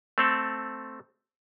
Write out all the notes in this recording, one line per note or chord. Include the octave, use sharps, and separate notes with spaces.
A3 C4 A4